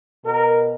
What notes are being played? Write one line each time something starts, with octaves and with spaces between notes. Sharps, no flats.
B2 A#4